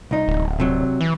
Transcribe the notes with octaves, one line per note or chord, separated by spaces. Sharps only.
C2 D#4
D1
C3 F#3
E3